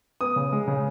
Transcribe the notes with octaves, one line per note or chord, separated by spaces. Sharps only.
B3 D#6
C#3
G#3
C#3